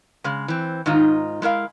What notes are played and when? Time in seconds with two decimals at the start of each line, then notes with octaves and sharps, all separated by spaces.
0.24 C#3 G#3
0.48 E3 C4
0.86 G#2 D#3 D#4 F4
1.42 G#3 E4 A#4 F5